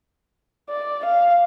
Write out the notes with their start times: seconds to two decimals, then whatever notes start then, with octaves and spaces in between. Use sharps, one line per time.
0.70 D5
1.05 F5